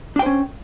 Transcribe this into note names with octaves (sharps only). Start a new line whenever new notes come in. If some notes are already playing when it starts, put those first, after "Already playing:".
C#4 D4 C5 G5